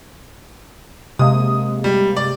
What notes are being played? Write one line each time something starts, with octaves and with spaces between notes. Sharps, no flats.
C3 G#3 A#3 D#6
G3
D5